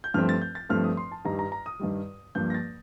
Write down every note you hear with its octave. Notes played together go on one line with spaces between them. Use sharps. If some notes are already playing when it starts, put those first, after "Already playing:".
G6
G2 F3 A3 C4 F6
A6
G6
A6
G2 F3 A3 C4 F6
D#6
C6
A5
G2 D#3 G3 A#5
A#5
A#5
D#6
G2 D#3 G3
G2 F3 A#3 G6
A#6
A6